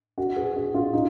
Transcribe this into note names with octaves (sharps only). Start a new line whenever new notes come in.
F#4
G#4
F#4
F4
D#4